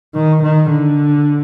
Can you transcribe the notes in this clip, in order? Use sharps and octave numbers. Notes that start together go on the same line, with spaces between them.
D#3
D#3
D3